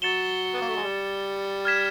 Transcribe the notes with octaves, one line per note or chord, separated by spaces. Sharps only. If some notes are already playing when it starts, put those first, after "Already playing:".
F#3 A6 C#7 E7 G7
B3
A#3
A3
G#3
G3
F6 G#6 B6 E7